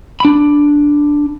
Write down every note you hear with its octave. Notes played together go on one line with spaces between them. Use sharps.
D4 B5